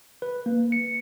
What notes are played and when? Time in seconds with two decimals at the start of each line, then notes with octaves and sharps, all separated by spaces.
0.22 B4
0.46 A#3
0.72 C#7